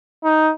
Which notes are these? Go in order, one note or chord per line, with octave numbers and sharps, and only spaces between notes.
D#4